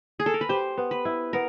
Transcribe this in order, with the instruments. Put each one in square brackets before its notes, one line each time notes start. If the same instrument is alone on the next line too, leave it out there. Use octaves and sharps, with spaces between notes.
[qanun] G#4
A4
A#4
B4
[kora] G4 [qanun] C5
[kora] B3
[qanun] B4
[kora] E4
[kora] B3 [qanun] A#4